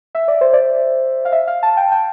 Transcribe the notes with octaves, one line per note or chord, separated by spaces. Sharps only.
E5
D5
C5
D5
F5
E5
F5
A5
G5
G5